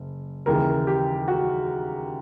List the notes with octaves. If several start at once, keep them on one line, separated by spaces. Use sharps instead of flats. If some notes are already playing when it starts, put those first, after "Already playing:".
Already playing: F#1
D#2 C#3 E3 A#4
G4
F#4